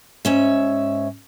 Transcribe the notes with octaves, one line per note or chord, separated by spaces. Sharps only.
G#2 C#4 E5